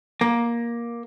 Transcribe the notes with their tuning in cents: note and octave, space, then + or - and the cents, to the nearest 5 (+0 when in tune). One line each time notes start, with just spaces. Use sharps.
A#3 +15